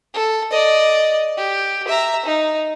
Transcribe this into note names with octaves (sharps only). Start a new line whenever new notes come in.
A4
D5 D#5
G4
E5 A#5
D#4